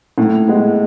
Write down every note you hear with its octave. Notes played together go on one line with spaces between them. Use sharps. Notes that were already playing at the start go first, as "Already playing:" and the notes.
A2
G#3 B3